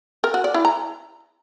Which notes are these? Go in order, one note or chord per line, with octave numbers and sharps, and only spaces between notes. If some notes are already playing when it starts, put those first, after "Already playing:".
A#4
F#4
D5
E4
A#5